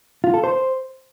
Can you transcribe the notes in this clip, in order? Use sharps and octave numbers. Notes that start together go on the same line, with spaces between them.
F4
A4
C5